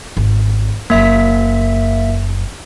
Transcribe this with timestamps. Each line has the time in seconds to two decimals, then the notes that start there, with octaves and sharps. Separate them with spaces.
0.17 G#1
0.90 F#1 F#2 A#3 E5 B6